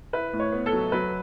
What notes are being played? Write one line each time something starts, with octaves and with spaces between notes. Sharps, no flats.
E4 B4
A2
C#5
B3
A4
F#3
F#3 B4